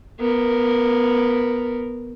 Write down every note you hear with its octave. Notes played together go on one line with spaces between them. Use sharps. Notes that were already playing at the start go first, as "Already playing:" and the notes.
B3 A#4